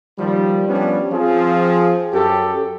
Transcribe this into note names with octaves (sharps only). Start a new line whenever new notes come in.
D#2 D#3 F3 G3
F3 G3 B3 C#4 D4 G4
F3 C4 G#4
F#2 G4 A4